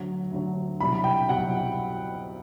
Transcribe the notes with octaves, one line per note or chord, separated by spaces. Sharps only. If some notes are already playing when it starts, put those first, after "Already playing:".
Already playing: D2 D3 F#3
D2 D3 F#3
C2 B2 F#3 B5
G5
C2 B2 F#3 F#5